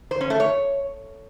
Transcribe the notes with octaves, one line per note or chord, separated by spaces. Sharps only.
C5
C#4
A3
C#5